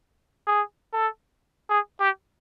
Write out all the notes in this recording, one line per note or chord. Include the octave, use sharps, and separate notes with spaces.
G#4
A4
G#4
G4